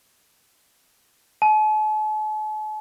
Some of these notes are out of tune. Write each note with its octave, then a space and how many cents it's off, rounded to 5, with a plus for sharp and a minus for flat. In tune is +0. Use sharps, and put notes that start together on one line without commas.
A5 -45